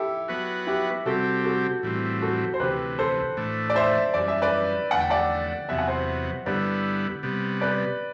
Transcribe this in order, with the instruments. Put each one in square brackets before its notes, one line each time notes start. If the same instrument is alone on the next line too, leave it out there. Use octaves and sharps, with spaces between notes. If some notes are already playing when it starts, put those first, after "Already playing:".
Already playing: [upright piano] E4 G4 A4
[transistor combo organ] F#3 B3 F#4 B4
[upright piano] E4 G4
[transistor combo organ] C3 G3 C4 G4 [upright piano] F#4 A4
[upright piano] F#4 A4
[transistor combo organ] A2 E3 G3 C4
[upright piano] F#4 A4
C5
[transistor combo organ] D2 C3 E3 [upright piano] G4 B4
[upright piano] A4 C5
[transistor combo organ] A2 E3 A3 D4
[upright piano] D5
C5 E5
[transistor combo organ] F#2 E3 G3 [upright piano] D5
[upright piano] E5
B4 D5
[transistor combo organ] E2 D3 A3 [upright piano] F#5
[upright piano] G5
D5 F#5
[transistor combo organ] E2 C3 F#3 B3 [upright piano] E5
[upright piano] F#5
C5 E5
[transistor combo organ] G2 D3 G3 B3 E4 [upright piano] B4 D5
[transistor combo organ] C3 G3 B3
[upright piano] B4 D5